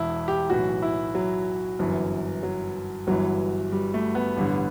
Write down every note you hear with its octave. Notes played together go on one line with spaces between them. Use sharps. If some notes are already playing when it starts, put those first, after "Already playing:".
Already playing: E1 E2 E4
G4
B1 A2 E3 F#4
E4
F#3
G1 F#2 E3
F#3
G1 G2 E3 F#3
G3
A3
B3
A1 G2 D3